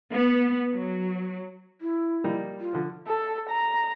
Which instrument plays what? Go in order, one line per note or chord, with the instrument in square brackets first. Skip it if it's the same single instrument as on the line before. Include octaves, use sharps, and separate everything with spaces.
[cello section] B3
F#3
[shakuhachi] E4
[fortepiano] G3 A#3 D#4
[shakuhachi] F4
[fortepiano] D3 F3
[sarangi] A4
A#5